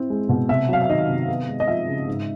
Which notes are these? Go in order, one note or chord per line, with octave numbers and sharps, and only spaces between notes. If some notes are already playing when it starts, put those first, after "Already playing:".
Already playing: C4 E4
G#3
B2
C3 E5
F#3 F5
E5
D#3 D#5
C3
B3
G#3
D#5
F3 E5
C#3
G#2